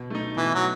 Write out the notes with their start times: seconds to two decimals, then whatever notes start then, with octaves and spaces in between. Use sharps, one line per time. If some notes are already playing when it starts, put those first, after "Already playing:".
Already playing: B2
0.10 A3 D#4
0.37 B2 E3
0.54 F#3